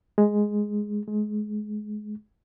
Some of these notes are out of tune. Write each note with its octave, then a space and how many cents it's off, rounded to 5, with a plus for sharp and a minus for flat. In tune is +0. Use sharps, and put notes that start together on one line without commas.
G#3 +0
G#3 +25